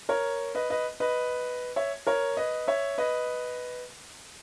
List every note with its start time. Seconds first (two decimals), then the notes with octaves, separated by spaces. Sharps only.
0.09 A#4 C#5
0.55 B4 D#5
0.70 B4 D#5
1.00 B4 D#5
1.76 C#5 E5
2.07 A#4 C#5
2.37 B4 D#5
2.67 C#5 E5
2.98 B4 D#5